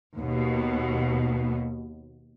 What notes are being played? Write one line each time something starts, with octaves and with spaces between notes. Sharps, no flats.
D#2 B2